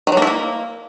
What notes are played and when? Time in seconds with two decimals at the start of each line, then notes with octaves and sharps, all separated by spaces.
0.07 D#3
0.12 F#3
0.17 A#3
0.22 E4
0.27 A#3